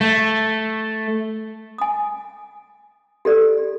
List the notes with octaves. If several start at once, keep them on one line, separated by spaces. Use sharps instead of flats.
A3
G#5 D#6
G4 A4 D5